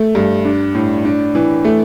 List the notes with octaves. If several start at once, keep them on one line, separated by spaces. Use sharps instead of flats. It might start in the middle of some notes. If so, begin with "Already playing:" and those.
Already playing: A3
G2
D4
A2
D4
E3
A3